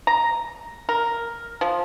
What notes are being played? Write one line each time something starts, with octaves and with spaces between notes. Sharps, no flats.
A#5
A#4
F3